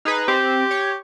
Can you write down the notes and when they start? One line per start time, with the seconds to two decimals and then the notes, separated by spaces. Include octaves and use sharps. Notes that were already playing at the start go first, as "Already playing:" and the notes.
0.05 D#4 G#4 B4
0.28 C4 G4
0.71 C#5